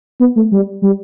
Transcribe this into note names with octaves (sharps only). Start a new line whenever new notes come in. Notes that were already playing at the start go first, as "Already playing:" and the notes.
B3
A3
G3
G3